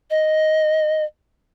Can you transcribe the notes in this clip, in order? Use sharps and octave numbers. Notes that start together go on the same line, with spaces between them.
D#5